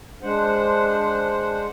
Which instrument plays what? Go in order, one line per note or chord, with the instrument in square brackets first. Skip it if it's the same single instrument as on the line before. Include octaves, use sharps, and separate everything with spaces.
[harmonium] G#3 D4 C5 F#5